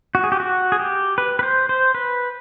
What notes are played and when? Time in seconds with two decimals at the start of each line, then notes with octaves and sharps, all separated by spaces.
0.15 F#4
0.24 G#4
0.32 G4
0.40 F#4
0.72 G#4
0.79 G4
1.18 B4
1.39 B4
1.43 C5
1.69 C5
1.95 B4